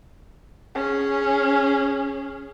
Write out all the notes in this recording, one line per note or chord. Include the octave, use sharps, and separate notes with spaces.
C#4 G#4